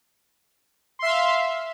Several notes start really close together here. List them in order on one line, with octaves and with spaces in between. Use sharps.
C6 E5 F5